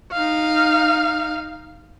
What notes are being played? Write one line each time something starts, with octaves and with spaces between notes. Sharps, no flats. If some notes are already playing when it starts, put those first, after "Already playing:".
D#4 F5